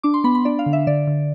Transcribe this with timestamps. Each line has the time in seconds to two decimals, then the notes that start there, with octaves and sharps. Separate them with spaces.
0.03 D4 D6
0.14 C6
0.24 B3 B5
0.35 B5
0.45 D4 D5
0.59 F5
0.66 D3
0.73 E5
0.87 D3 D5
1.07 D3